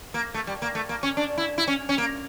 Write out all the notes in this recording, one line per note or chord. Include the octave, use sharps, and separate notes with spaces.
A#3
A3
G3
A#3
A3
A#3
C#4
D4
E4
E4
C#4
C#4
A#3